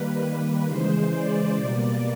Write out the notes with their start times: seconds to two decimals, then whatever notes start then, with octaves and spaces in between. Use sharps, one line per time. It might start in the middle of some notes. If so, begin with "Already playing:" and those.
Already playing: D#3 G3 A#3 B4
0.21 B4
0.66 C#3 E3 G#3 C5
1.11 D5
1.56 B2 G3 A#3 D5